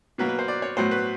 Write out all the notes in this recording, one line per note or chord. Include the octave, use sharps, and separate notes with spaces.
B2 F#3 A#3 B4
B4
C5
D5
C#5
A2 F#3 B3 C5
B4